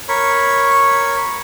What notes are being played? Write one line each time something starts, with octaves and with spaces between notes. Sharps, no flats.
A#4 C#5 B5 C#6